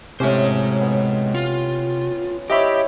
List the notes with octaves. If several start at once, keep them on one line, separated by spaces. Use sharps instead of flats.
A2 C3 G#3 C#4 G4 C5
B3
F4
E4 G4 C5 C#5 D#5 E5 B5